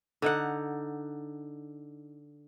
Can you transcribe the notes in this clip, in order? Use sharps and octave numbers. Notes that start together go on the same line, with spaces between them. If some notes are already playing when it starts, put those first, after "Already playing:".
D3 D#4 F#5